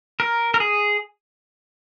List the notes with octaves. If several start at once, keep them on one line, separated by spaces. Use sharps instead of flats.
A#4
A#4
G#4